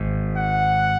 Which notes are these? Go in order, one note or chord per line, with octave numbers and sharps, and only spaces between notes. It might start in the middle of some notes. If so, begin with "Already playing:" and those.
Already playing: G#1 G#2
F#5